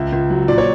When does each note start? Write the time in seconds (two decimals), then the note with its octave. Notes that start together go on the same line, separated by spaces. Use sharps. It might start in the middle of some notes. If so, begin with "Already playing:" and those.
Already playing: C#2 E5
0.13 C#2
0.30 F#3
0.48 A#2 D5
0.58 C#5